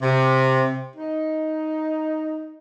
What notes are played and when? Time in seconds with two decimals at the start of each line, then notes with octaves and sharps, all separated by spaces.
0.02 C3
0.96 D#4